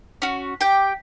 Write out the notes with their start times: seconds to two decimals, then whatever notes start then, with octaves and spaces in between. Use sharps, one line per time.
0.22 C#4 F#4
0.61 G4 G5